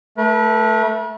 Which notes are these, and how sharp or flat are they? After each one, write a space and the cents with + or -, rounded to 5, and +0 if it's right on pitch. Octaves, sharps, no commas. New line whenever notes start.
A3 +0 B4 -45